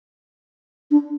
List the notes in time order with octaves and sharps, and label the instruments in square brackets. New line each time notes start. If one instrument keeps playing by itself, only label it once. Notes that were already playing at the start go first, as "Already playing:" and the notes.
[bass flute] D4